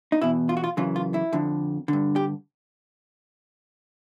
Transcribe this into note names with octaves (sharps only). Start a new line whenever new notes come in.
D#4
E2 B2 E4
F4
F#4
F4
F#2 C#3 E3 F4
F4
E4
F2 D3
G2 D3
G4